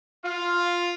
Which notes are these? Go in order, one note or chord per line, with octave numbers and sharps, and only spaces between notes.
F4